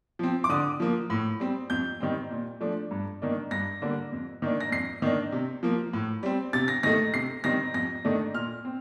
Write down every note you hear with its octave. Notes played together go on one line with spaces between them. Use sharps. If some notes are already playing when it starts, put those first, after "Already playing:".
F3 C4
D6
D3 D#6
F3 A#3
A2
G3 C4
F2 G6
D#3 G3 C4
A#2
F3 A3 D4
G2
D#3 A#3 D4
G2 A#6
D3 G3 A#3 D4
F2
D#3 A#3 D4
A#6
F2 C7
D#3 A#3 D4
C3
F3 A#3
A2
G3 C4
C3 A6
A#6
D#3 A3 A#6
C3 C7
D#3 G3 C4 A#6
F2 A#6
D#3 A3 D4
A#2 F6
C4